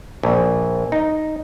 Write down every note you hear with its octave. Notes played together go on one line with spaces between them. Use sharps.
A#1
D#4